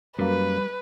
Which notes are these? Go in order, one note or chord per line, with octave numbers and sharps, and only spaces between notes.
F#2 G3 A#3 B4